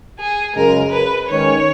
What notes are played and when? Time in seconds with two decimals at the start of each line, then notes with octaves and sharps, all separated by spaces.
0.19 G#4
0.56 F#2 C#3 G#3 A#4
0.91 B4
1.29 D#3 G#3 C#4 C#5